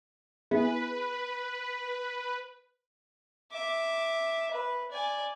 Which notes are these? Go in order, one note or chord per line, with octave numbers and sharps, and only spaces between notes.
B3 E4 G#4 B4
E5 D6
B4
D5 G#5